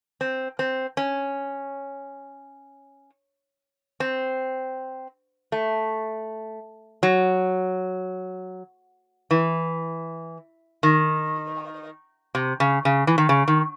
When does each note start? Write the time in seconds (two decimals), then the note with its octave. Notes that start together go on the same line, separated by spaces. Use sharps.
0.21 C4
0.59 C4
0.97 C#4
4.00 C4
5.52 A3
7.03 F#3
9.31 E3
10.83 D#3
12.35 C3
12.60 C#3
12.85 C#3
13.07 E3
13.18 D#3
13.29 C#3
13.48 D#3